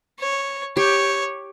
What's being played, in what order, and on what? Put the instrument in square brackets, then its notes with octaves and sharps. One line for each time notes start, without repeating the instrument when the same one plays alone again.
[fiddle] C#5
[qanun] G4 [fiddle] C#5